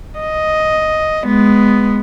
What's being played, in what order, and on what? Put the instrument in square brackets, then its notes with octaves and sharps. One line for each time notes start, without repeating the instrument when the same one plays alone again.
[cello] D#5
G#3 B3